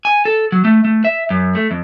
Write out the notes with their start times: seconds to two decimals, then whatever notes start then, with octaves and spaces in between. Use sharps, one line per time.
0.05 G#5
0.25 A4
0.52 F#3
0.65 A3
0.85 A3
1.05 E5
1.30 F#2
1.55 A3
1.71 F2